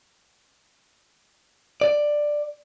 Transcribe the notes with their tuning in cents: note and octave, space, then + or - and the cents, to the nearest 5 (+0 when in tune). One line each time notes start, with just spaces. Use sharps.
D5 +10